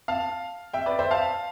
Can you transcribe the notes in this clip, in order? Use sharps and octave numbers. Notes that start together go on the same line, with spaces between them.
F5 A5
E5 G5
B4 D5
C5 E5
F5 A5